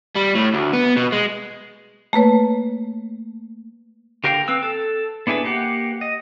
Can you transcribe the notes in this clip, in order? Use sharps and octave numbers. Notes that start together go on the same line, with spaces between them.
G3
A2
D2
B3
B2
G#3
A3 A#3 B4 C#5
D3 G4 A#4 F5 G5
C4 B4 E6
A4
B3 D4 E4 G#4 B4
A#3 G4 F#5
D#5